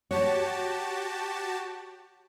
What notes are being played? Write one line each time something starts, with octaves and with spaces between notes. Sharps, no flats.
F#4 G4 C#5 A5